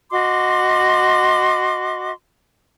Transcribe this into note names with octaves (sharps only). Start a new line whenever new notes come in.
F#4 D#5 C6 D6